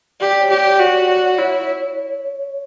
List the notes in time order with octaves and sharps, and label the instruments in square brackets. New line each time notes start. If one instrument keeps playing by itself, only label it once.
[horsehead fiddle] G4 [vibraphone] D5
[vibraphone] C#5
[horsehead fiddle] G4
[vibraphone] D5
[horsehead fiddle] F#4
[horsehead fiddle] E4 [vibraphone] C#5